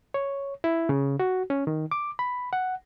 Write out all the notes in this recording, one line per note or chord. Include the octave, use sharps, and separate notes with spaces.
C#5
E4
C#3
F#4
C#4
D#3
D6
B5
F#5